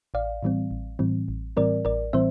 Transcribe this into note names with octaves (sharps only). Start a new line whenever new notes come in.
A1 D5 F5
A2 E3 G3 C4
A1
A2 E3 G3 C4
A1
A2 E3 G3 C4 A#4 D5
A1 A#4 D5
A2 E3 G3 C4 C5 E5